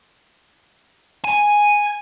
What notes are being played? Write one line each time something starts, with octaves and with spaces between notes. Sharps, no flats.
G#5